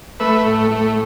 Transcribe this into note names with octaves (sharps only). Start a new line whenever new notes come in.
A3 B4 E5
A2
A3